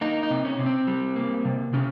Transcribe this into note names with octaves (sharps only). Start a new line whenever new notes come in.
A#3 D#4
D#4
C3
C#4
C3
C4
G3
A#3
C3
C3 C#4